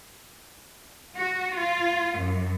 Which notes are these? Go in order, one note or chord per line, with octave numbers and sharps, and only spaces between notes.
F#4
F4
F#2